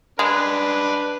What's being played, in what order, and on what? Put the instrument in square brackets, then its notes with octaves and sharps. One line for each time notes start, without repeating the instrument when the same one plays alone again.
[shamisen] G#3 [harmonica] D4 B4